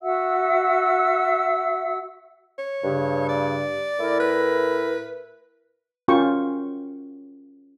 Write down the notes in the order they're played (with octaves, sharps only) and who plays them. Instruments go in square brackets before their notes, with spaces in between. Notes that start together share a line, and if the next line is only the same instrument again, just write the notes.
[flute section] F#4 E5 F#5 E6
[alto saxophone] C#5
[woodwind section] G2 C#3
[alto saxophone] D5
[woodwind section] A2 E4 A#4
[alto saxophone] B4
[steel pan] C#4 F4 F#4 A#4 G5 C#6